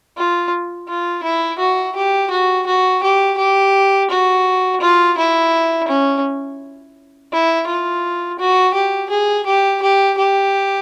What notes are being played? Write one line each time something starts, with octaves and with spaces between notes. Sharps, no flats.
F4
F4
E4
F#4
G4
F#4
F#4
G4
G4
F#4
F4
E4
C#4
E4
F4
F#4
G4
G#4
G4
G4
G4